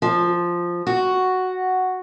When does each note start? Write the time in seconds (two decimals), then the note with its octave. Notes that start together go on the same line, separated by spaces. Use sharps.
0.02 F3
0.87 F#4